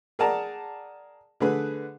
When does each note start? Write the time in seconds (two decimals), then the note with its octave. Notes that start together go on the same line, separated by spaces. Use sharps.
0.19 G#4 A#4 D5 F#5 A5 A#5
1.40 D3 A3 G#4 B4